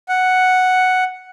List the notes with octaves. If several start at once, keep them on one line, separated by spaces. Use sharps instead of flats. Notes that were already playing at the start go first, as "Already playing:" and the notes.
F#5